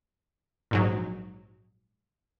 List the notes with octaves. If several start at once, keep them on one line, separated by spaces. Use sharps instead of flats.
A#1 G#2 F#3